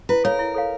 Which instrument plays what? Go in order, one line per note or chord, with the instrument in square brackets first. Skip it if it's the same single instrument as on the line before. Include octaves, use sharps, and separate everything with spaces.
[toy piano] E4 [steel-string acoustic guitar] B4
[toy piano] A4 C#5 F5 [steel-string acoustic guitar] A#4
[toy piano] E4
A4 C#5 F5